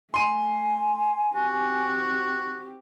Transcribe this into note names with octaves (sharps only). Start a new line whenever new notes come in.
A3 G#5 C6 D#7
C4 F#4 G4